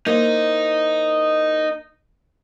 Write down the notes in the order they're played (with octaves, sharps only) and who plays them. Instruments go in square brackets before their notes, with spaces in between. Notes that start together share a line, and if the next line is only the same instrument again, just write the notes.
[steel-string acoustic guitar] A#3 E4 C5 [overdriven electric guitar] D#4